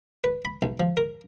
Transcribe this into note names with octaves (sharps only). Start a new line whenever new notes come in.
B4
B5
B1
F3
A#4